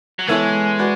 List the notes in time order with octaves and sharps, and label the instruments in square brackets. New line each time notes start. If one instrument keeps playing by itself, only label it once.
[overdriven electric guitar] F#3
[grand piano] E3 B3 E4 A4 C#5 [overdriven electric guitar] G#3
[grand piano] F#4 B4 D5